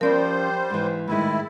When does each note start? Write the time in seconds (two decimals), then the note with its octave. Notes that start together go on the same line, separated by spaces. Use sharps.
0.01 F3 G3 C#4 F4 A#4 C5 D5 B5
0.70 G#2 E3
1.08 A2 D#3 G#3 E4